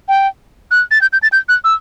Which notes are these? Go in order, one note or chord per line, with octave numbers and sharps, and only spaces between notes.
G5
F#6
A6
G6
G6
A6
G6
F#6
E6